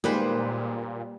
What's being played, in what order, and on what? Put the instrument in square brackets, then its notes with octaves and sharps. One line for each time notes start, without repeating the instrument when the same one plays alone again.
[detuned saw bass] A#2 [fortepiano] D#3 G#3 [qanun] G3 B4 C5 [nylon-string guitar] A#3